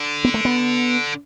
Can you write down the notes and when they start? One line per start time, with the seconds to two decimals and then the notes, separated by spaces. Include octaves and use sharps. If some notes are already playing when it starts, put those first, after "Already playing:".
Already playing: D3
0.24 B3
0.34 A3
0.45 B3